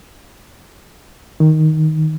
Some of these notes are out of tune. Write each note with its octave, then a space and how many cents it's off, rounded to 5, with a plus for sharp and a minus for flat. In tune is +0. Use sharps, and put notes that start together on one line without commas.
D#3 +5